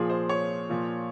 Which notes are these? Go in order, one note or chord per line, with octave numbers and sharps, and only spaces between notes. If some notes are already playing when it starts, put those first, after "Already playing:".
Already playing: A#2 F3 G#4
C5
C#5
A#2 F3